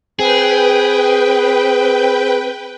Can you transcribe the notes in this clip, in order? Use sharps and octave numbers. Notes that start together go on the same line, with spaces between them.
C4 G#4 B4 G5